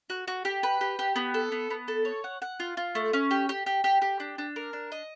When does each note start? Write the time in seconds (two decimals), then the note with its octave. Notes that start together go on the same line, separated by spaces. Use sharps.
0.10 F#4
0.28 F#4
0.45 G4
0.63 B4
0.81 G4
0.99 G4
1.16 B3
1.34 A4
1.52 B3
1.70 B3
1.88 A4
2.05 C#5
2.24 F#5
2.42 F#5
2.60 F4
2.77 F4
2.95 A3
3.13 C#4
3.31 G4
3.49 G4
3.66 G4
3.84 G4
4.02 G4
4.20 D4
4.38 D4
4.56 A#4
4.73 D4
4.92 D#5